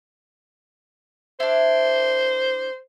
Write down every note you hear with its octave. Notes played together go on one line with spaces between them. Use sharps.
D4 E4 C5